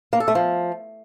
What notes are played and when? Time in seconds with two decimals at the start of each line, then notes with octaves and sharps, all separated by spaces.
0.13 A#3
0.20 A4
0.28 A3
0.35 F3